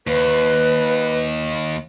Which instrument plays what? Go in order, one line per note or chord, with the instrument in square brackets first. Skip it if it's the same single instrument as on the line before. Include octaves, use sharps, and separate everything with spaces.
[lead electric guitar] D#2 [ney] B4